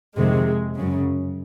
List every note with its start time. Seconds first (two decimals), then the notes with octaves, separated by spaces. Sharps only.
0.17 F2 C3 D#3 G#3
0.75 F#2 C#3